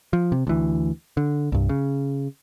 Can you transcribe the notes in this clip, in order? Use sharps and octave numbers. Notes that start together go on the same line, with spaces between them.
F3
C3
D2 E3
D3
C2 G2
C#3